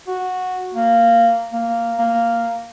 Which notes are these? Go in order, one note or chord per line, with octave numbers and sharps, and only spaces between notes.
F#4
A#3
A#3
A#3